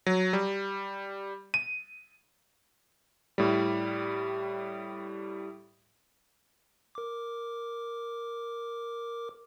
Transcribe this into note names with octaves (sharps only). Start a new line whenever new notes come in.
F#3
G3
D#7
A2 G3
A#4 D6